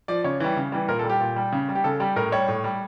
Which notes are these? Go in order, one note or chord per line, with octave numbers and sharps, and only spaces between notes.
F3 D5
C#3 C#5
E3 G3
C#3
E3 G3
A#2 A#4
A4
G3
G4
A#2
G3
C#3
G3
G4
C#3 A4
G3 G4
A2 A#4
G3 C#5
A2
G3